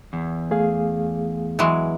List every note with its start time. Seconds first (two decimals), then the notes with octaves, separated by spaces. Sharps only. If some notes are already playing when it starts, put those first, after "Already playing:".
0.13 E2
0.51 A3 G#4 F5
1.59 E3 F#3 G#3